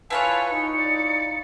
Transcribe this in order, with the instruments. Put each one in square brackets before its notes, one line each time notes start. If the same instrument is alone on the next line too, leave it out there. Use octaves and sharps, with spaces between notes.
[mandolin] E4 F4 C#5 [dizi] B4 [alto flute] G#5 [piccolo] A5
[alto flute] D#4 [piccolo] C#7
[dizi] D5